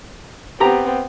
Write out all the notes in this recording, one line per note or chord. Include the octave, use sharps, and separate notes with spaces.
B3 C4 G4 A#5